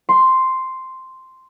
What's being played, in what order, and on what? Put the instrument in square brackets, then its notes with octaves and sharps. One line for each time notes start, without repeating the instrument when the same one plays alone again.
[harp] C6